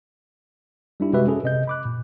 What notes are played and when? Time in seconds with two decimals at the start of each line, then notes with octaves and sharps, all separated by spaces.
1.00 G3 D4 E4 G4
1.13 C3 G#3 F#4 G4 B4 E5
1.27 C#4 G#4 A4 B4
1.43 C3 D#5 G6
1.68 B5 D6 F#6
1.85 A#2